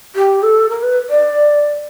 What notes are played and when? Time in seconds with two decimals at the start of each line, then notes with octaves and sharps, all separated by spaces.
0.15 G4
0.42 A4
0.69 A#4
0.82 B4
1.09 D5